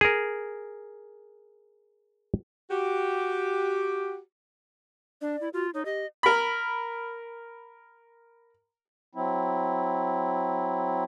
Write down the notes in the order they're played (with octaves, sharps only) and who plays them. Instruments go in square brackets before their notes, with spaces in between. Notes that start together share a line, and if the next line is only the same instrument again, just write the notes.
[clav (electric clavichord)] G#4 A#4
[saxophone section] F#4 G4
[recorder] D4 [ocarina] D5
[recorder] E4
[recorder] F4 [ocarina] F#4
[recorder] D#4 [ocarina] C#5
[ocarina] G4 [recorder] D#5
[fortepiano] A#4 B5
[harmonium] F#3 C4 E4